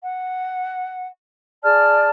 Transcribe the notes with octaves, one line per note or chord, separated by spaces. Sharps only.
F#5
G#4 D5 A5 F6